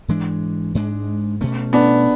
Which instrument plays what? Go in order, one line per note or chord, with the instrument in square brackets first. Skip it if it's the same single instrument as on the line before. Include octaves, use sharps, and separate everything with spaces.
[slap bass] G#2 E3 G#3 D4
G#2 G#3 D4
B2 A3 C#4
[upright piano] B3 D4